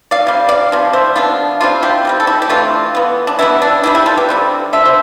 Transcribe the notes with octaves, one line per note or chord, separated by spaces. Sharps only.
D5 F5
C3 G3
D5 F5
C3 F3
C5 E5
C3 F3 B3 D4 F4
C3 G3 C4 D4 F4
E4 G4
C3 G3 C4
A4
E4 G4
G4
E3 A3 C4 D4 F4
E3 B3
D4
E3 G3 B3 E4
D4
C3 G3 B3 E4
E4 G4
F4 A4
G4 B4
D3 G3 C4
D3 F3 E5
C5